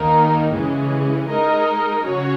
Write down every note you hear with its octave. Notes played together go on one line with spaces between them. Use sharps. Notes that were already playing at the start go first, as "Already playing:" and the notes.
Already playing: D#2 D#3 A#3 D#4 A#4
C#3 E3 G#3 C#4 G#4
G#3 D#4 A#4 D#5
C#3 F#3 C#4 F#4 C#5